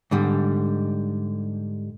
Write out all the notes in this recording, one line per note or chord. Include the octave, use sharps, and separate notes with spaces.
G#2 D3 G3